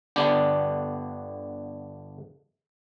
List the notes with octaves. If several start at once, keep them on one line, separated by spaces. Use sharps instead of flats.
G1 D3 B3 D4 G4